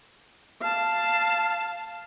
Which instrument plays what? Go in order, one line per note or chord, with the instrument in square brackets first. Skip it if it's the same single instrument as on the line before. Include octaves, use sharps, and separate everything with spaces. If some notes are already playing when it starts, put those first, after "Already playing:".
[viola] F5 A5